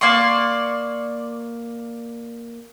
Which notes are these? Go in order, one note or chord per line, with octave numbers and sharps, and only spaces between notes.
A#3 D5 C6 C#6